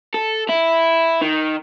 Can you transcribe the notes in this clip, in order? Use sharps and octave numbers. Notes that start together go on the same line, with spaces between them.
A4
E4
D#3